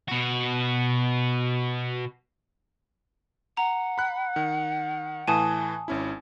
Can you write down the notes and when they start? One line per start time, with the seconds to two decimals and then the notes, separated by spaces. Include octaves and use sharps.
0.08 B2 F#4
3.57 F#5 A#5
3.98 B5 F#6
4.36 D#3
5.28 A2 E3 G#5 A5 D#6
5.88 G#1 C#4 E4